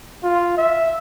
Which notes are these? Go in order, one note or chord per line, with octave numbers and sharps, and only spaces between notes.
F4
E5